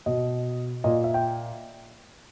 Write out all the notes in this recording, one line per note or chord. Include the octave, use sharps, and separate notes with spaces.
B2 D#5
A#2 D#5
E5
G5